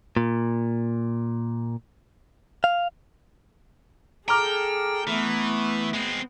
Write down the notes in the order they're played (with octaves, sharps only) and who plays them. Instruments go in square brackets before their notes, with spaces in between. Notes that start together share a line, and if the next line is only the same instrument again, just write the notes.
[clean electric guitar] A#2
F5
[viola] G#4 A4 [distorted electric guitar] G5 [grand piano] A#5 D6 F6
[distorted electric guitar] E3 [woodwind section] A3 [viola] B3
[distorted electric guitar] G#3 C4